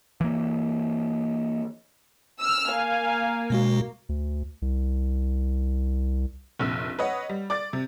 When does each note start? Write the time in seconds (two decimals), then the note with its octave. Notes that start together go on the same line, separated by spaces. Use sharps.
0.21 E3 A#3
2.42 E6 F6
2.72 A#3 F5 G#5
3.50 B2 G#3 F#4
4.09 D2
4.62 C2
6.59 F1 A#1 E6
6.99 B4 C#5 D#5 F#5
7.29 G3
7.50 D5 D6 A6
7.73 C3